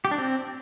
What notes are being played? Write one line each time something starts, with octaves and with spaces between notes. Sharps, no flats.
G4
D4
C4